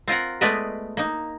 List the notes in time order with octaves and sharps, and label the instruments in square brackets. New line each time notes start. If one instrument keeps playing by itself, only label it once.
[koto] C4 F4 A#4 F#5
G#3 A3 B3 B4 D5 D#5
A#3 D#4